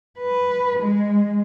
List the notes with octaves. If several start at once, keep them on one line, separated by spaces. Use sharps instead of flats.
B4
G#3